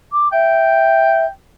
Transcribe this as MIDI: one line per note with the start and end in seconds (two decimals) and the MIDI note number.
0.12 0.28 86
0.32 1.25 76
0.32 1.30 79